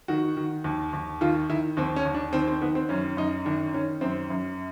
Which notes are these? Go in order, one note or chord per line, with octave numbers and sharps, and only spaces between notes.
D#3 F#4
D#3
D#2
D#2
D#3 F4
D#3 E4
D#2 C4
C#4
D#2
D4
D#3 C4
C4
D#3 B3
C4
F#2 C#4
F#2 D#4
D#3 D4
D#3 C#4
F#2 C4
F#2